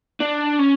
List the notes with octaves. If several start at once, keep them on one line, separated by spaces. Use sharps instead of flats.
D4
C#4